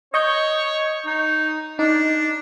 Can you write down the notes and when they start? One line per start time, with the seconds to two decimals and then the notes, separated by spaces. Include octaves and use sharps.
0.14 C#5 D#5 C#6 G6
1.05 D#4
1.79 D4 D#4